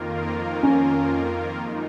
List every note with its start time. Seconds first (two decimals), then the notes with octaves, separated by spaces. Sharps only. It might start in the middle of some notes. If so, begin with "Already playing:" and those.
Already playing: F2 D#3 A#3 F4 A#4
0.63 C#4
1.57 F#2 D#3 G#3 D#4